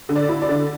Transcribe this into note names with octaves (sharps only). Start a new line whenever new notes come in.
D3
D5
E4
D5
D3